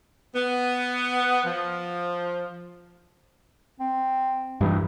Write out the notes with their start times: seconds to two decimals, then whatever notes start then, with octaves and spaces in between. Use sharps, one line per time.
0.34 B3
1.44 F3
3.80 C4
4.61 G2 E3 D#4